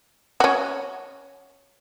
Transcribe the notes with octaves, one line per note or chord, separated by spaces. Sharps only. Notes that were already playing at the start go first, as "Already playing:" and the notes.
C#4 F#4